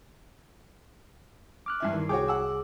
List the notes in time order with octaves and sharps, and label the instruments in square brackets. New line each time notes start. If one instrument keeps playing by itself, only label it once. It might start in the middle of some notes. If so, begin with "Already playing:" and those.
[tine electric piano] D6 F6 F#6
[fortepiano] G2 E3 E5
[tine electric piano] D#3
[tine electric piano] C2 G#4 D6 [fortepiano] F#4 C#5 G5
[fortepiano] F#5 E6